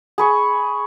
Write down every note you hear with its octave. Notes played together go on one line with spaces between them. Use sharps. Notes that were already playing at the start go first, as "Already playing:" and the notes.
G#4 B5 C#6